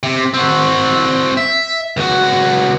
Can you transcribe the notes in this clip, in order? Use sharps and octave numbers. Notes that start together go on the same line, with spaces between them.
C3
C4 F#4
E5
C#2 F#4